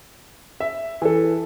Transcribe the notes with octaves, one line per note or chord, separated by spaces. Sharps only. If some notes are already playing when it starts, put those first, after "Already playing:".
E5
E3 A4